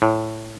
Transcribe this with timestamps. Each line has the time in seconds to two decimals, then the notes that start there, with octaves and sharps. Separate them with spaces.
0.02 A2